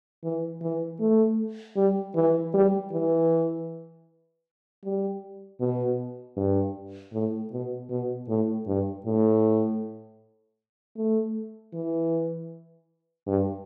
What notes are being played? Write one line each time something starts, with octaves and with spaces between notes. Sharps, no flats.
E3
E3
A3
G3
E3
G3
E3
G3
B2
G2
A2
B2
B2
A2
G2
A2
A3
E3
G2